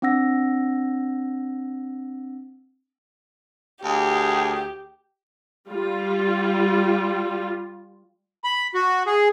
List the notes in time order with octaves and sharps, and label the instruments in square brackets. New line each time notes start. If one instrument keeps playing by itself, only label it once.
[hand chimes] C4 D4 F#5 E6 A#6
[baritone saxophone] D2 [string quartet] G4 [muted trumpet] G#4
[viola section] G3 F4
[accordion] B5
F#4
G#4